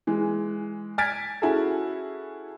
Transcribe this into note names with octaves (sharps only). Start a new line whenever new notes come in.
E3 G#3
G#5 F6 G#6 A6 B6 D7
C#4 E4 F#4 G#4 A4